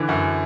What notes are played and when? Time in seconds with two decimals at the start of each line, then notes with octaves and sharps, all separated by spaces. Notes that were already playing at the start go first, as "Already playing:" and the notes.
Already playing: D3 E3
0.09 F#2